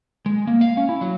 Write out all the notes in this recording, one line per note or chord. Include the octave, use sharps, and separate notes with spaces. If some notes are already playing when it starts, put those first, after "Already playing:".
G#3
A#3
F5
C#4
E4
F#3